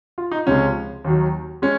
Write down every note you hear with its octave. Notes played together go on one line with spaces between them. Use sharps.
F4
D#4
C#2 C3 F3 G#3 C#4
D#2 D#3 F#3
G#3 C#4